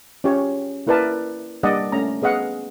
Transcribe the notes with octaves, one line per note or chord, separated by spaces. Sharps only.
C#4 F4 G4 C#5
A#3 E4 A#4 B4 D5 A5
G3 A#3 D4 D5 D#5 F#5
A3 C#4 A#5
B3 G#4 D#5 F5 F#5